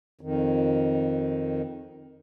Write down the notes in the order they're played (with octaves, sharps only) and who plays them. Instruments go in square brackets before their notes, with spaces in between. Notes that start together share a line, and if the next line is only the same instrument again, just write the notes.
[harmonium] F2 D#3